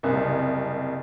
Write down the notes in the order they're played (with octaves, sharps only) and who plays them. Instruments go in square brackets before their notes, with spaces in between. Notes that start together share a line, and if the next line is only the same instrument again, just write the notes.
[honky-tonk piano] F#1 C2